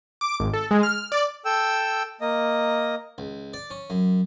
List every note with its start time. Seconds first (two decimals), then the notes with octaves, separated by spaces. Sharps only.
0.21 D6
0.40 G#1
0.54 A4
0.71 G#3
0.83 F6
1.12 D5
1.45 A4 G5 E6
2.21 A#3 D#5
3.18 C#2
3.53 D5
3.70 C#4
3.90 F#2